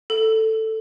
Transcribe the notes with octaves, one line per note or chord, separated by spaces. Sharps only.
A4